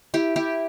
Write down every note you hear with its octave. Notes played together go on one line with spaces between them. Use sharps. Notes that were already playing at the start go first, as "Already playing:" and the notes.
E4 G4
E4 G4